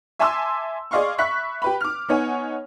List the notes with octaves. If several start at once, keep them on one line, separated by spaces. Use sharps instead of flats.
E5 G#5 A5 C6 D6 E6
G#4 D5 D#5 F5 C6 C#6
E5 B5 C#6 F#6 B6
G4 B4 B5
D6 F6
B3 D#4 C#5 F#5 G#5